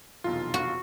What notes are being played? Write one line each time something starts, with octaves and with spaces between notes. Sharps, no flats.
F1 B1 E2 F4
F#4